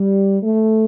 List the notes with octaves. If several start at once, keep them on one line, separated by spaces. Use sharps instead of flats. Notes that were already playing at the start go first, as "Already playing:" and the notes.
Already playing: G3
A3